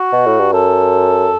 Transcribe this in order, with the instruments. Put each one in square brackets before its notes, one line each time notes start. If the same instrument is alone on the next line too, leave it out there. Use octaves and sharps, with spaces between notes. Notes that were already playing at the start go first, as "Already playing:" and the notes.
Already playing: [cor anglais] F#4
[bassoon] B2
A2
G2
[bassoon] F#2 [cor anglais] A4